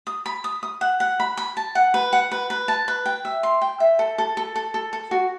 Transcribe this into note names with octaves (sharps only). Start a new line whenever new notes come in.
D#6
B5
D#6
D#6
F#5
F#5
B5
B5
A5
F#5
B4
F#5
B4
B4
A5
B4
G5
E5
C6
G5
E5
A4
A4
A4
A4
A4
A4
F#4